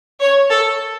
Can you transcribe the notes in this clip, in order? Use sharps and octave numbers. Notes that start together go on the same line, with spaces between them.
C#5
A4